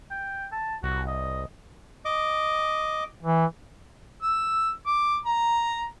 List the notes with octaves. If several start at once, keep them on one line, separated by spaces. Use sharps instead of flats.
G5
A5
C2 F#4
D#5
D#5 D6
E3
E6
D6
A#5